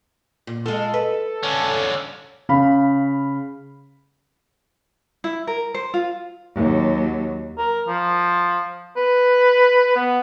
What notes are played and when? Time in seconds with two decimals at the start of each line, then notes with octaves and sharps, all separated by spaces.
0.47 A#2
0.66 G#3 F4 A4
0.94 B4
1.43 D3 C#4
2.49 C#3 F5 B5
5.24 E4
5.47 A#4
5.74 C5
5.94 F4
6.55 D#2 F#3
7.58 A#4
7.87 F3
8.96 B4
9.96 B3